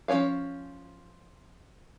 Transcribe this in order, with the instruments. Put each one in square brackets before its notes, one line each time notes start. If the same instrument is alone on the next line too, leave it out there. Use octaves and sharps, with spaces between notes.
[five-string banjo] F3 C#4 B4 C#5 F5